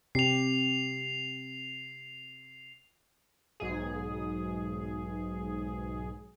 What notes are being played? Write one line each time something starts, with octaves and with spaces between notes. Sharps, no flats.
C3 C4 G4 C7 F7
B1 G#2 G#4